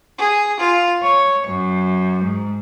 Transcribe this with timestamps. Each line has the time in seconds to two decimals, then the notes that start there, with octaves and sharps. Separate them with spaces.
0.17 G#4
0.58 F4
1.03 C#5
1.47 F#2
2.23 G#2